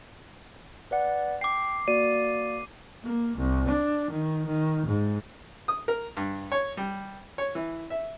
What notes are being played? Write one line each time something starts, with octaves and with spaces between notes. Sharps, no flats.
B4 D5 F#5
G5 D6 C7
A#3 F#4 D5 D#7
A#3
C2
D4
D#3
D#3
G#2
D#6
A#4
G2
C#5
G3
C#5
E3
E5